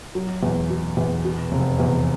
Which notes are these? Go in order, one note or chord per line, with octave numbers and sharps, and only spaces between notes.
F#3
E2
B2
E2
B2
F1
E2